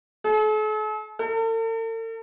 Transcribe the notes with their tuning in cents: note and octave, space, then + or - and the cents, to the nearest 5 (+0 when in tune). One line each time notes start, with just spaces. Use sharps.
A4 -45
A4 +45